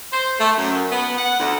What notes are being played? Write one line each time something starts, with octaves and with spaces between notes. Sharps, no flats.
C5
A3
F#2
B3
F#5
D2